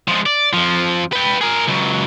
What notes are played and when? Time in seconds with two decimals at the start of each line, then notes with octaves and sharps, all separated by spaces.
0.08 F3 G#3
0.26 D5
0.53 F2 F3
1.12 B4 G5
1.41 G#4 A#4
1.68 C#2 F#3